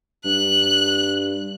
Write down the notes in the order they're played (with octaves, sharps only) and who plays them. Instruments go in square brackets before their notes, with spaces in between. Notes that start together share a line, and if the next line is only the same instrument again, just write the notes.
[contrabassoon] G2 [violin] F#6